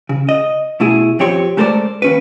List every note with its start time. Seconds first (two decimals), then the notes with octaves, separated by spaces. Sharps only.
0.09 C#3
0.29 D#5
0.80 B2 A3 E4 G#4
1.19 F2 C4 G4 C#5 C6
1.57 G#3 A3 A4 A#4 C5 D5
2.02 D#2 C#4 B4